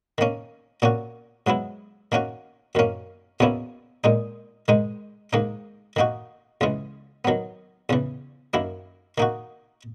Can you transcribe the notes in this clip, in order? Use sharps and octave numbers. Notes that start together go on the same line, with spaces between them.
D#3 A#3 C#4
A#2 A#3 C#4 F#4
G#2 F#3 B3 E4
D#3 A#3 C#4 F#4
F#2 D#3 A#3 C#4
E2 B2 A#3 C#4 E4
A#2 G#3 D#4
G#2 D#3 G#3 D#4
G#2 D#3 A#3 D#4
D#3 A#3 D#4 F#4
C#2 C#3 E3 G#3
D#3 F#3 B3
E2 C#3 E3
F#2 D#3 A#3 E4
D#3 A#3 D#4 F#4